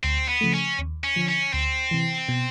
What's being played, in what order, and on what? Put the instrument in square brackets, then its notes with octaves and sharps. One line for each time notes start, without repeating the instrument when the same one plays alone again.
[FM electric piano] D2 [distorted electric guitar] C4
[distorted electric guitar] B3
[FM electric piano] C#3 F3 A3
[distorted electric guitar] C#4
[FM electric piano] D#2
[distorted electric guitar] C#4
[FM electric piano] D3 F3
[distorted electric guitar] C#4
[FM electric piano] D2 [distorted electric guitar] C4
[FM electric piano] C3 E3
B2